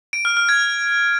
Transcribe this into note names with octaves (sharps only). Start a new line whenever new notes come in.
D7
F6
F6
G#6